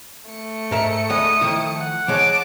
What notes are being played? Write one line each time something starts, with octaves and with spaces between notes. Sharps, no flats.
A3 C#7
G#2 A#4 E5
D2 G#3 F#5 D#6
D#3 F3 E4
F#5
E3 G#3 C#5 A5 D6